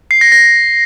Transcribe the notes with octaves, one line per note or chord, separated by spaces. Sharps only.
C7
A#6
A#6